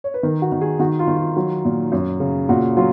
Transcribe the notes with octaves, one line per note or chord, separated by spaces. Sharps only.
C#5
B4
D#3 A#4
F#4
D#3
G#4
D#3 F#4
F4
D#3
F4
F#3
A#2
F#2
C#3
A#2 F#4
F#3 F4